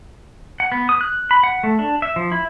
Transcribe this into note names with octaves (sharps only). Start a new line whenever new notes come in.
F#5
B3
D#6
F#6
B5
F#5
A3
D4
E5
F3
E4